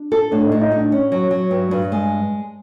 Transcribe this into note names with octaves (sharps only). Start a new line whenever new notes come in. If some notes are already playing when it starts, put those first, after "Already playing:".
Already playing: D4
A4
A2 D4
D#4
A2
D#4
A2 D4
C#4
F#3
F#3
G2
G2
G#3